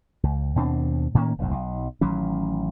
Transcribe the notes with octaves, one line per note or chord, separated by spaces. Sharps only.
C#2
D#2 B2 C4 D4
A2 D#3 A#3 C#4
F1 B1 G2
B1
A1 D#3 F#3 C#4